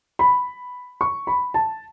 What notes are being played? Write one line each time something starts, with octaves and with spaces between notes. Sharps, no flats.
B5
C#6
B5
A5